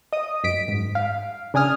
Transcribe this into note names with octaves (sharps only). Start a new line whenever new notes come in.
D#5 D#6
F#2 B6 D7
G#2
F5
C#3 D4 G#5 D#6 F6